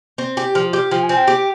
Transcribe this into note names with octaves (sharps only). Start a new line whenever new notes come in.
C4
G4
F3
G4
F3 G5
G#5
C4
G5
G4